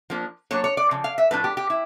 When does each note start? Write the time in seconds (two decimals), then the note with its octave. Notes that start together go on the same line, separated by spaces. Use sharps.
0.10 F3 A#3 D4
0.51 F#3 A#3 D4 C#5
0.64 C#5
0.77 D5
0.91 C#3 F3
1.04 F5
1.18 E5
1.31 A2 F3 A3 D4 B4
1.44 G4
1.57 G4
1.70 E4